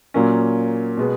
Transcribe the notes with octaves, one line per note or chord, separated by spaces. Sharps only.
A#2 F#3 A#3 C#4
B2 G#3 B3